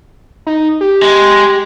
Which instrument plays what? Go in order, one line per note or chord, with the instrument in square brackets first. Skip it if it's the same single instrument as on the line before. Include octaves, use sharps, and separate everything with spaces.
[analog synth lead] D#4
G4
[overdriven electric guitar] G#3